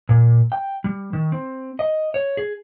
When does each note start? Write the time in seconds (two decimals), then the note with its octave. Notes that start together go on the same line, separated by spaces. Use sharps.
0.09 A#2
0.52 G5
0.84 G3
1.13 D#3
1.32 C4
1.79 D#5
2.14 C#5
2.37 G#4